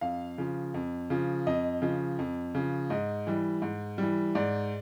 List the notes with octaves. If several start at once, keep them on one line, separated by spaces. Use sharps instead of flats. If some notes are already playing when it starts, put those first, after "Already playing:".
F2 F5
C#3 F3
F2
C#3 F3
F2 D#5
C#3 F3
F2
C#3 F3
G#2 D#5
E3 G3
G#2
E3 G3
G#2 D5